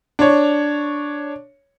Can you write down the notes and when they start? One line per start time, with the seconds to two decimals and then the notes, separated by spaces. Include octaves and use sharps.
0.19 D4 C#5